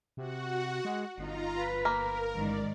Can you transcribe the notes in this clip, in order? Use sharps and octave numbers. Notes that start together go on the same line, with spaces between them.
C3 F#4 F#5
G#3
G1 D#4 F4 A#5
B4
A#3 A#4
A1 G#2 D#3 D5